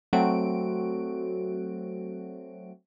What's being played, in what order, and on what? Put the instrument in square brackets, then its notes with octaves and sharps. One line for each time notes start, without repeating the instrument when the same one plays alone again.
[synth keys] F#3 A3 C4 F#4 D7